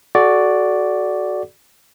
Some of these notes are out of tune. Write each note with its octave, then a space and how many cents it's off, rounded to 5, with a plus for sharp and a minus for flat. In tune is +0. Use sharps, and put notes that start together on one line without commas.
F#4 +0 A4 -40 D5 +0